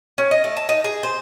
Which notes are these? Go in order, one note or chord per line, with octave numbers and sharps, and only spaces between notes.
C#4
D#5
A3
A5
D#4
G#4
C5